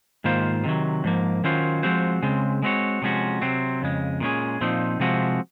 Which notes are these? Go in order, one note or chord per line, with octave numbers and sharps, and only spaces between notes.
G#2 D#3 A#3 F4 C5
C3 D#3 F#3
G#2 F3 A#3
D#3 F#3 C#4 F4 C5
F3 G#3 C4 F#4 C5
C#3 G#3 C4
G#3 C4 F#4 C#5
C3 F3 G#3 C#4 F#4
C3 F#3 C4
F2 C#3 G#3
A#2 G#3 C#4 G#4
A#2 F3 C4 D#4
C3 F3 G#3 C4 F#4